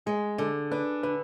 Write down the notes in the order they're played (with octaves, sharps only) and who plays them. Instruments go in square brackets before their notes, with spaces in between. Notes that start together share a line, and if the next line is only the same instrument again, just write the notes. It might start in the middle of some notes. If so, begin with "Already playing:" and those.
[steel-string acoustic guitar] G#3 [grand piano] G#4
[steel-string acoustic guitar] D3 [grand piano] A4
[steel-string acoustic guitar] D4 [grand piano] B4
[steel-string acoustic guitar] D3 [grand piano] B4